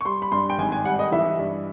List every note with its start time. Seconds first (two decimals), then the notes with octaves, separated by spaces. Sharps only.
0.01 C#6
0.05 G3 C6
0.22 B5
0.32 G2 C6
0.50 G5
0.58 G#1 G#5
0.72 G#5
0.85 G3 F#5
0.99 D#5
1.12 E3 E5
1.39 G2